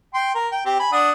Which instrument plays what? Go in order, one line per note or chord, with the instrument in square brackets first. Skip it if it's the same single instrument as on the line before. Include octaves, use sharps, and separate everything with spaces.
[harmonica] G5 C6
A#4
G5
C4 G4
G#5 B5
D4 F#5 D#6